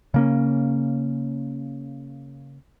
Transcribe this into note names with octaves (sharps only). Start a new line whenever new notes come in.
C#3 A#3 C#4